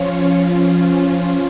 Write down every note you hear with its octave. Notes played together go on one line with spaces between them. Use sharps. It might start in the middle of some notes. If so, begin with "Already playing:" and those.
Already playing: F3 C#4 F4 C#5
F3 C#4 F4